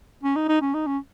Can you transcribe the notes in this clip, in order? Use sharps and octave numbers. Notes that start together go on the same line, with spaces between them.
C#4
D#4
D#4
C#4
D#4
C#4